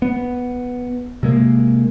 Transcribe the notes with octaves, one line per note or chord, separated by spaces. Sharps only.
B3
C3 G#3 A#3